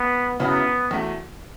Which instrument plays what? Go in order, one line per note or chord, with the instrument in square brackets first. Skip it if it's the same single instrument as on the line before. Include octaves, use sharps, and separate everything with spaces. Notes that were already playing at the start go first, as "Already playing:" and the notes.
Already playing: [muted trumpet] B3
[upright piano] F#2 C#3 F#3 C#4 E4 [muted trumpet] B3
[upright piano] E2 E3 A3 F#4